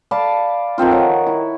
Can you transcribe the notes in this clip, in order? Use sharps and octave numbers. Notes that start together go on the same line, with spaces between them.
D5 F5 A5 B5
D#3 F3 C4 F4
C#5 F#5
E4